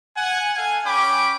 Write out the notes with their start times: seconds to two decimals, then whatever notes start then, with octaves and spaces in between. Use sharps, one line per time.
0.16 F#5 G#5
0.55 A4 F5 G#5
0.84 C#4 G5 B5 D6